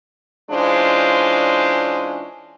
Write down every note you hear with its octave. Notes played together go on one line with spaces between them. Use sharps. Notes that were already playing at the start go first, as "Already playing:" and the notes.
E3 G#3 C#4 D4 F4 C5